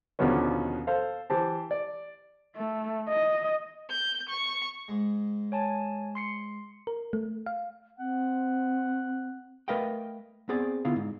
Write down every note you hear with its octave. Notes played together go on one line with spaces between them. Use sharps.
D#2 B2 D3 F3 B3 C#4
A4 C5 F5
E3 G4 C5 A5
D5
A3
D#5
G6
C#6
G#2 G#3
C#5 G#5 A5
C6 C7 C#7
A#4
A3
F5
C4 F#5
A3 A#4 B4 D#5 F5 G5
B3 C4 G#4 D5
D3 B3 E4 F4 F5
G#2